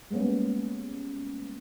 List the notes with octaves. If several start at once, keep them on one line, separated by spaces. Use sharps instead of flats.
G3 G#3 A#3 B3 C#4